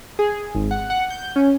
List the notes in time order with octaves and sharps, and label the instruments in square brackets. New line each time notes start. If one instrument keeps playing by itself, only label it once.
[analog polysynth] G#4
G#1
F#5
F#5
G6
C#4